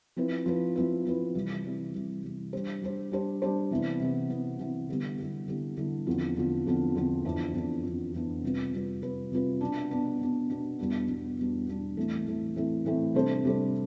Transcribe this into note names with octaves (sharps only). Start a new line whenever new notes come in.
F3 C4 E4 B4
F3 C4 E4 B4
F3 C4 E4 B4
F3 C4 E4 B4
C3 E3 G3
C3 E3 G3
C3 E3 G3
C3 E3 G3
G3 D4 G4 C5
G3 D4 G4 C5
G3 D4 G4 C5
G3 D4 G4 C5
C3 E3 B3
C3 E3 B3
C3 E3 B3
C3 E3 B3
D3 G3 B3 E4 G4
D3 G3 B3 E4 G4
D3 G3 B3 E4 G4
D3 G3 B3 E4 G4
E2 D3 F3 C4 F4
E2 D3 F3 C4 F4
E2 D3 F3 C4 F4
E2 D3 F3 C4 F4
F2 E3 B3 D4
F2 E3 B3 D4
F2 E3 B3 D4
F2 E3 B3 D4
C3 G3 C4 F4 B4
C3 G3 C4 F4 B4
C3 G3 C4 F4 B4
C3 G3 C4 F4 B4
B2 B3 D4
B2 B3 D4
B2 B3 D4
B2 B3 D4
E2 B2 G3 B3 D4
E2 B2 G3 B3 D4
E2 B2 G3 B3 D4
E2 B2 G3 B3 D4
A2 E3 A3 C4
A2 E3 A3 C4
A2 E3 A3 C4
A2 E3 A3 C4
C3 G3 D4 A4 C5
C3 G3 D4 A4 C5